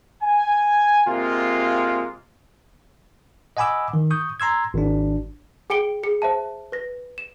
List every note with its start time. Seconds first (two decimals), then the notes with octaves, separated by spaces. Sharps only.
0.23 G#5
1.07 C3 G#3 A#3 F4
3.57 D#5 F#5 G#5 B5 D6 E6
3.94 D#3
4.11 C#6 D#6 G6
4.40 A#5 C6 E6 G#6
4.74 G#1 D4
5.70 G#4 G5 C#7 D7 G7
6.03 G#4 C#7
6.22 C5 E5 A5
6.72 B4 A#6
7.18 E7